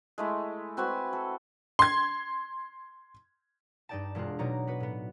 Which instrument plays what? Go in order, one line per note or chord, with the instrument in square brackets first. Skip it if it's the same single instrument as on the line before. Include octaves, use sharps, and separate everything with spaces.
[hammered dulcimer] G#3 A3 E4
C4 F#4 B4 G#5
A4
[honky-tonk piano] C6 G#6
[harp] G2 G3 D#4 D5 G5 A5
E1 G#3 D4 F4 F#6
B2 F#3 D#4 C#5 D5 A#5
B3 F#4 B4
A2 B3